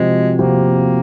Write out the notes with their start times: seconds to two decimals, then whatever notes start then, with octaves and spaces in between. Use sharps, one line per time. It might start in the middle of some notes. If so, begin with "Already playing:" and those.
Already playing: C3 F3 G#3 C4 F#4
0.38 C3 F3 A#3 C4 F#4